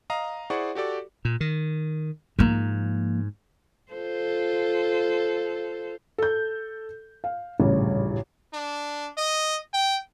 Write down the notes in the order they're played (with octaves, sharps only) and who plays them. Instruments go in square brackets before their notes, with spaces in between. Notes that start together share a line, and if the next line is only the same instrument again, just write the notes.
[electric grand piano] D#5 F5 A#5 D#6
E4 G#4 C5 D5 F#5 C#6
F#4 G4 A4 D5 D6
[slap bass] A#2
D#3
[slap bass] G#2 [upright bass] F3 A#3
[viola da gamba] F4 A4 C5
[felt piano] A4 G6
F5
D#1 A1 G2 C#3
[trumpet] D4
D#5
G5